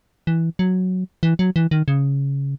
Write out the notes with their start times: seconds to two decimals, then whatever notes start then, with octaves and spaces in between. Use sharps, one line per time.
0.27 E3
0.59 F#3
1.23 E3
1.39 F#3
1.56 E3
1.71 D#3
1.88 C#3